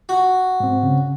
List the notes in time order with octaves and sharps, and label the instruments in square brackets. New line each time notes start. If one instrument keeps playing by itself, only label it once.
[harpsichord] F#4
[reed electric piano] G#2 C4
C#3